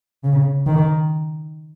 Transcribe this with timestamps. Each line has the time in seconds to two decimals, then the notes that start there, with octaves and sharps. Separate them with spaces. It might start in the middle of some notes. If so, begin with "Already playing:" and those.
0.24 C#3
0.67 D#3